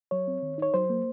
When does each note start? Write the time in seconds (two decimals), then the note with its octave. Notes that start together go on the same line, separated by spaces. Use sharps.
0.11 F#3 C#5
0.28 C4
0.42 D#3
0.58 D#4 C#5
0.74 F#3 C5
0.90 A#3